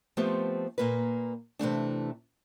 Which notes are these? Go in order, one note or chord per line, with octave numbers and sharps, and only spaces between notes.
F3 A3 B3 C4 G4
A#2 A#3 B4
C3 E3 A3 D4